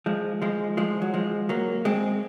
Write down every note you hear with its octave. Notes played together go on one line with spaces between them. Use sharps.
F3 G#3
F3 G#3
F3 G#3
F#3
F3 G#3
F#3 A#3
G#3 C4